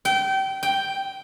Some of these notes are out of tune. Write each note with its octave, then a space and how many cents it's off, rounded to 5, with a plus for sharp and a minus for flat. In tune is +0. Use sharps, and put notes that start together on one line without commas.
G5 -25
G5 +0